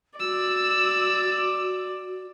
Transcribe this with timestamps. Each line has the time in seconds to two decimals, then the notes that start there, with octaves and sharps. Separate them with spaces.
0.20 F#4 D5 E6